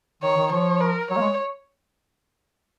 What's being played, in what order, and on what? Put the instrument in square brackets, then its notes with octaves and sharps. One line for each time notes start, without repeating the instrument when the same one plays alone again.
[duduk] D#3 [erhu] C#5
[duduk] D#3
[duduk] F3 [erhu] C#5
[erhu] A#4
[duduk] F#3 [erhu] C#5
[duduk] A#3
G#3